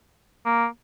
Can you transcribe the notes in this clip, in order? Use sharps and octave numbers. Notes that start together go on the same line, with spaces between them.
A#3